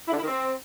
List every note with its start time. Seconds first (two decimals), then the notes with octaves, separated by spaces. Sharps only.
0.07 E4
0.12 D3
0.17 E4
0.23 D#3
0.28 C4